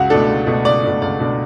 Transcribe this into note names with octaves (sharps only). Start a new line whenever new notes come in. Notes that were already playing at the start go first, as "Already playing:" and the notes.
Already playing: C#2 F#4
B2 A3 D4 A4
C#2
B2 A3 D4
C#2 D5
B2 A3 D4
C#2 D5
B2 A3 D4